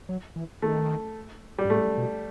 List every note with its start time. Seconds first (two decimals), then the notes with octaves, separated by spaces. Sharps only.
0.09 F#3
0.36 E3
0.62 D#3 A3
1.58 G3
1.65 G2
1.70 A2 A3
1.97 B2